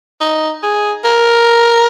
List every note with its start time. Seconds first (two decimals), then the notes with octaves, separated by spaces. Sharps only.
0.20 D#4
0.63 G#4
1.04 A#4